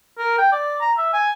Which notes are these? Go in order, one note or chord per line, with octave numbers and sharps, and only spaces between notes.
A#4
G5
D5
A#5
E5
G#5